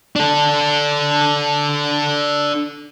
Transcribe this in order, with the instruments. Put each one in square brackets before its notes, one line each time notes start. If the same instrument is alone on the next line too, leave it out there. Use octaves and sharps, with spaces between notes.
[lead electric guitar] D4 A4